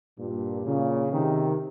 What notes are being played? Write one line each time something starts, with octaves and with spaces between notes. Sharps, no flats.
G2 A#2
A#2 C#3
C3 D#3